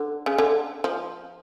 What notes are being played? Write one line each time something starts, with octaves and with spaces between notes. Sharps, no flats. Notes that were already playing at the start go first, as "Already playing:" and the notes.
Already playing: D3
C#3
D3
F3